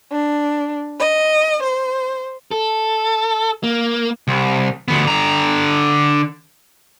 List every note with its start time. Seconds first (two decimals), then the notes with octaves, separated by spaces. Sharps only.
0.12 D4
0.99 D#5
1.63 C5
2.51 A4
3.63 A#3
4.28 C2
4.88 D2 B3
5.05 D3 A#5